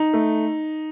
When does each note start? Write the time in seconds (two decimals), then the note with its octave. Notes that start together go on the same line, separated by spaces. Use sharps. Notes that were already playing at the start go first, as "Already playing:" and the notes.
Already playing: D#4
0.13 A3